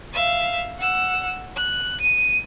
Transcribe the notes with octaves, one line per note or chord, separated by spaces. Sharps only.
E5 F5
F#5 E6
F#6
D#7